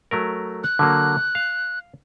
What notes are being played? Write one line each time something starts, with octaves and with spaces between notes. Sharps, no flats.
F#3 A3 A#4
F#6
D3 F#3 A#3
F5